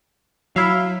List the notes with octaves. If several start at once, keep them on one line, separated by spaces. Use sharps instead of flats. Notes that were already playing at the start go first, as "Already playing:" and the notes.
F#3 E4 E5 F5